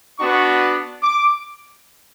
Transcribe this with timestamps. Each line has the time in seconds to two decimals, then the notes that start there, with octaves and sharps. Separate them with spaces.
0.19 B3 D4 F#4 C#6
1.02 D6